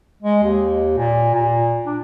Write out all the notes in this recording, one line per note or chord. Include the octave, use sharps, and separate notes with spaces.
G#3
D#2
A#2
A#2
D4